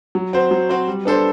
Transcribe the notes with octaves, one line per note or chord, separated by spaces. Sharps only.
F#3
C4 F#4 C5
F#3
C4 F#4 C5
G3
B3 D4 A4 C5